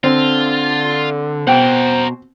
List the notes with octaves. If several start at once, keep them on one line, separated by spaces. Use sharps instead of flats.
D3 C4 F4
B2 A#4 C5 F#5 G5